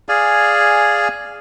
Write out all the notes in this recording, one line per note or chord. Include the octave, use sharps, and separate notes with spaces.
G#4 D5 F5 G#5